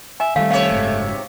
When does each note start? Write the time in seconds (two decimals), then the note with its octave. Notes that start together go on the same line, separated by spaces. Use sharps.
0.20 E5 G#5
0.36 D#3 G3 A3 F5
0.51 C3 C#5 F5
0.70 F#1 G#2